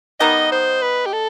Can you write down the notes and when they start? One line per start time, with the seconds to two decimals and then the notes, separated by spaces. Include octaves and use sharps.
0.20 D#3 G3 B3 D#4 D#5
0.52 C5
0.82 B4
1.06 G4
1.13 A4